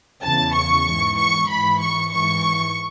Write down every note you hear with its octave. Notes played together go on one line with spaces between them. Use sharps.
E2 C#3 E3 A5
C#6
G#2 E3
C#6
G#2 E3 B5
C#6
G#2 E3 C#6